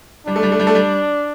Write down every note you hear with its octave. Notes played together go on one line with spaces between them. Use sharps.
G3 D4
A3
G3
A3
G3
A3
G3